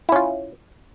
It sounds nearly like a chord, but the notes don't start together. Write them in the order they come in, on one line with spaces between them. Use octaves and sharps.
E4 C#4 F4